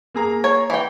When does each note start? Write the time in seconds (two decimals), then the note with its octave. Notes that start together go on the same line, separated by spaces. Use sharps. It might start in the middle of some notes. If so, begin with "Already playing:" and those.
0.15 A#3 G#4 A#5
0.44 C#5
0.70 E3 G5